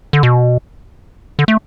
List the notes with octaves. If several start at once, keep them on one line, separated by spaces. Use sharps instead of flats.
D3
B2
D3
A3